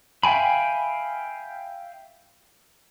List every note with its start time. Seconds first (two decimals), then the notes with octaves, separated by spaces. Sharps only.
0.23 E5 F5 G5 G#5 B5